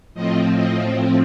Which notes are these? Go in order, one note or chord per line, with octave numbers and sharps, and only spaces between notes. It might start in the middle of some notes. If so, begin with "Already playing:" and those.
A2 F3 C4 D#5
D#5